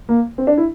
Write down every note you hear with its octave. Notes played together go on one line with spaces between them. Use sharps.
A#3
C4
D4
E4